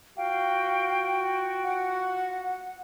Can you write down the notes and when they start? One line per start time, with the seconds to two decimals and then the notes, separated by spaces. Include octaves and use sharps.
0.17 F4 F#4 F5 G5
1.64 F#5